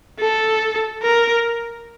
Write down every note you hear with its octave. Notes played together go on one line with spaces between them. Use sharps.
A4
A#4